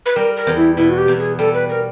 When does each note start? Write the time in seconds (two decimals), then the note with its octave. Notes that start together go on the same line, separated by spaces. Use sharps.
0.06 B4
0.16 G3 A#4
0.37 A#4
0.47 E2
0.57 E4
0.77 B2 E4
0.90 F#4
0.98 G4
1.08 E2
1.19 G#4
1.39 G3 A4
1.54 B4
1.70 A#4